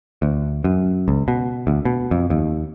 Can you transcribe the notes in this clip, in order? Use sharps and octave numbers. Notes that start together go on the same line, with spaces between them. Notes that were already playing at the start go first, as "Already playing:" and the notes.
D2
F#2
C#2
B2
D2
B2
F2
D#2